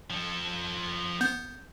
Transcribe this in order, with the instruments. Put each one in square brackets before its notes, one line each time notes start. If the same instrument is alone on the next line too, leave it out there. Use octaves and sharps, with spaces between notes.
[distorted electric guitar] F3 A4
[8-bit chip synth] B3 [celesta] G6